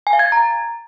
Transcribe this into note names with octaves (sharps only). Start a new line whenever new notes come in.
G#5
F5
G#6
A6
A#5